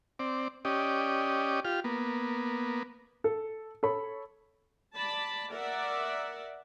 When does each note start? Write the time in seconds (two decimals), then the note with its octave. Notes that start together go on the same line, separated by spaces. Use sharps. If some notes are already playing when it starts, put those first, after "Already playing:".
0.19 C4 D5
0.65 C#4 G4 D5 D#5
1.65 F4 G4 F6
1.84 A#3 B3
3.24 A4
3.83 A4 C#5 B5
4.95 D5 A5 B5
5.52 A#4 D5 E5 F#5